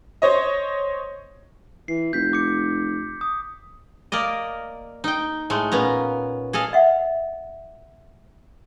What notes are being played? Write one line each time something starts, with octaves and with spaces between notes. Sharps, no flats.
C5 C#5 D#5
E3 C7
F1 G6 B6
D6 C#7
D#6
A#3 A#4 D5 D#5
D#4 G5
A2 G#3 A3
A#2 B3 C#4 A#5
G#4 A4 D#5 F5
D#5 E5 F#5